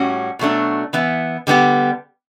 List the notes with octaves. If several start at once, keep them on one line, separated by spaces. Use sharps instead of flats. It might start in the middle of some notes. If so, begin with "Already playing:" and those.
Already playing: A2 G3 C#4 F#4
B2 F#3 A3 D4
E3 B3 E4
D3 G3 B3 D4 G4